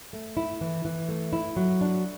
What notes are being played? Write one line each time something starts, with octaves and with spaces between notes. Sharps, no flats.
A3
E4
E3
E3
A3
E4
F#3
D4